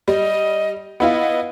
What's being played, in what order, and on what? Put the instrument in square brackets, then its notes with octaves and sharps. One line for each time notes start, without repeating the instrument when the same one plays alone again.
[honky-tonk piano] G3 [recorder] D#5
[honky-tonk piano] B3 E4 F4 [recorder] D#5